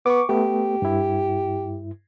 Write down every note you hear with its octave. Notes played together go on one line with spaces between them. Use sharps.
B3 C#6 D6
A3 B3 G4
G2 E4